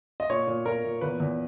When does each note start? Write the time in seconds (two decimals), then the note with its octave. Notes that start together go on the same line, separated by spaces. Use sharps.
0.20 D#5
0.30 A#2 C#5
0.47 A#2
0.65 A#2 A#4
0.84 A#2
1.01 E2 B4
1.20 E2